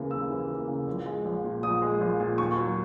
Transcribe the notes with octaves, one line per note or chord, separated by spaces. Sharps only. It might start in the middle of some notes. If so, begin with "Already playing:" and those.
Already playing: D#2 C#3 E3 A#3
D#2 E6
E3
A#3
C#3
A#1
G#3
A#1
A#2
A#1 D#6
G#3
A#1
A#2
D#2 C#6
F#3